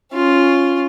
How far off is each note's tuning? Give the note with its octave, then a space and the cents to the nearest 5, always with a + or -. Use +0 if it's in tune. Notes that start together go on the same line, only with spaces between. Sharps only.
C#4 -5 F4 +0